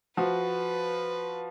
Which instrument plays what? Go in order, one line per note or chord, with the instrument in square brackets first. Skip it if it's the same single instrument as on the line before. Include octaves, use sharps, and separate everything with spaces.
[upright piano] F3 F#4 [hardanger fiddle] B4